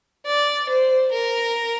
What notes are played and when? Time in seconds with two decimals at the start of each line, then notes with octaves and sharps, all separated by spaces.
0.26 D5
0.69 C5
1.12 A#4